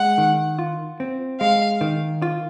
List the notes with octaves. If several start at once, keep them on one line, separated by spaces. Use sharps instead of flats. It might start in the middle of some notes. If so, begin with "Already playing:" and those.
Already playing: G#3 F#5
D#3
F4
C4
G#3 F5
D#3
F4